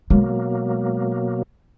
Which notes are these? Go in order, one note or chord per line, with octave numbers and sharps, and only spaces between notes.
B2 F#3 G#3 A#3